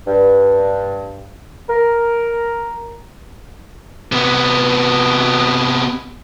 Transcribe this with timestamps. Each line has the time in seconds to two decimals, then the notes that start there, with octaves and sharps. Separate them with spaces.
0.07 G2
1.69 A#4
4.12 C3 B3